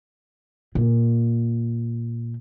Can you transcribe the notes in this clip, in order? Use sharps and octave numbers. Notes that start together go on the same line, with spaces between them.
A#2